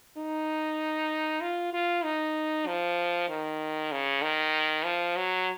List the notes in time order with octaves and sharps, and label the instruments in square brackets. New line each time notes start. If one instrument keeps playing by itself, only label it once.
[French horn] D#4
F4
F4
D#4
F3
D#3
C#3
D#3
F3
F#3